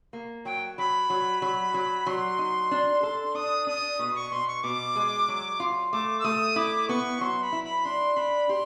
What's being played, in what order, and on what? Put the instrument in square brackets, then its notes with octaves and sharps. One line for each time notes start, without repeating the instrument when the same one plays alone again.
[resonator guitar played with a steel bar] A#3
[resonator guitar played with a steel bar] F#3 [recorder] G5
[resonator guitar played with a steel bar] F#3 [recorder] B5
[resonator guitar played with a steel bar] F#3
F#3
F#3
[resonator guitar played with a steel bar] F#3 [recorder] C6
[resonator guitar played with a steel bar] D#4
D4
A4
[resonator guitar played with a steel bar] D4 [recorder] D#6
[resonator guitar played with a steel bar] D4 [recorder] D#6
[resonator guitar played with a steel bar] B2
[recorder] C#6
[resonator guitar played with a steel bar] B2 [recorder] C6
[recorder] C#6
[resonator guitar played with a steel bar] B2 [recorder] D6
[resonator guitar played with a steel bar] G#3
F#3
F4
[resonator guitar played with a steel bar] A3 [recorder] D6
[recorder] E6
[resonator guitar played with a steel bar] A3 [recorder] D#6
[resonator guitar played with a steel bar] E4 [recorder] D6
[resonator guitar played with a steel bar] B3 [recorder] C#6
[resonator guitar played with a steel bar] F#3 [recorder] C6
[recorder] B5
[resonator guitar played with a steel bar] E4
[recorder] B5
[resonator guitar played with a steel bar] D4 [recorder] C6
[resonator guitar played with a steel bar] D4 [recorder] B5
[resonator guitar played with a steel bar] G4 [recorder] C6